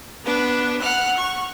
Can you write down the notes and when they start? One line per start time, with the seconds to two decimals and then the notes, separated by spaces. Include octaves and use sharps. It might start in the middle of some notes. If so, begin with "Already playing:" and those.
0.24 B3 D4 B4
0.80 F#5 F6 F#6
1.16 C#6